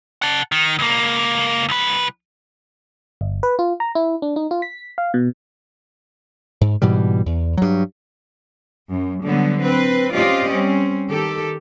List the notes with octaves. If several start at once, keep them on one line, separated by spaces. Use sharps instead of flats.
F#5 A5
D#3
C#2 A#3
C2 B4
G1
B4
F4
A#5
E4
D4
D#4
F4
B6
F5
B2
G#2
G#2 B2 E3 G3
E2
G2 F#3
F#2
D3 F#3 G3 B3
C4 B4
C4 C#4 F4 G4 D5 D#5
G3 C4 C#4
D#3 G4 A4